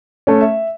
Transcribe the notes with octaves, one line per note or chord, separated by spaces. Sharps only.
A3 C#4
E5